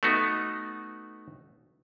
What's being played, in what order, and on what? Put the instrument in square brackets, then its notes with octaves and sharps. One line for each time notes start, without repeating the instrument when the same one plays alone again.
[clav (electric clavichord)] A3 B3 D#4 F#4